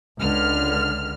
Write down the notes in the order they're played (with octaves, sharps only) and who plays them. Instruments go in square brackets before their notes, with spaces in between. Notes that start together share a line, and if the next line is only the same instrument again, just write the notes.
[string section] C#2 D3 F6